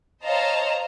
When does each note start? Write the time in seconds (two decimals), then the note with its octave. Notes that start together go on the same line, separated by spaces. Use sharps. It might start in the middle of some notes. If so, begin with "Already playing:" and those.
0.25 C5 C#5 D#5 F5 A5 A#5